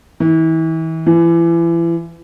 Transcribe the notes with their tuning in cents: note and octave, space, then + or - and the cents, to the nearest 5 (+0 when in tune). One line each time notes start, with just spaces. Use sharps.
E3 -35
E3 +30